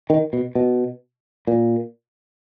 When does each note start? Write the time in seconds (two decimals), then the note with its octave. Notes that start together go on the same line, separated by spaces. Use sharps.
0.10 D#3
0.33 B2
0.55 B2
1.47 A#2